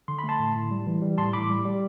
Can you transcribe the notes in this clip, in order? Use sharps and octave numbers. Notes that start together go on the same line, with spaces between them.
D3 C6
B5
A3
A5 C6
A2
A2
G3
E3
G3
A2 A5 C6
A2 B5 D6
G3
G3